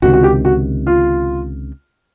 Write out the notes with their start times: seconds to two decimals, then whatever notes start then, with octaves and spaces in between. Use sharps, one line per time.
0.02 C#2 C3 D#3 F#4
0.13 F#4
0.24 G4
0.45 F#4
0.87 F4